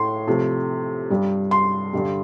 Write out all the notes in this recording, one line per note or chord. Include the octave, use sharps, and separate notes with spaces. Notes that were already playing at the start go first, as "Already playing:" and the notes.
Already playing: A2 A3 C6
C3 F3 A3
G2 G3
C6
G2 D3 G3